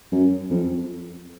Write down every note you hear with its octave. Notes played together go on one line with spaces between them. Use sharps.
F#2
F2